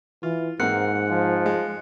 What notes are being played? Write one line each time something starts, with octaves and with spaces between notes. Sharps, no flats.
E3 F4
G#2 A#3 C4 F#5 F#6 C#7
F3
G#3